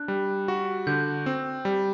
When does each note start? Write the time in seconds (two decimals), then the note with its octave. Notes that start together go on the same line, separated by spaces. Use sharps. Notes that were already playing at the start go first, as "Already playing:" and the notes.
Already playing: D4 F#6
0.08 G3
0.48 F#4
0.87 D3 G6
1.26 C4
1.65 G3